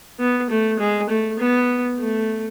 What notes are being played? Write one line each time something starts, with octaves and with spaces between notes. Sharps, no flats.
B3
A3
G#3
A3
B3
A3